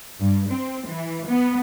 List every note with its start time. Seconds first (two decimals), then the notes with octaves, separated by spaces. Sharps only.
0.20 G2
0.51 C4
0.87 E3
1.29 B3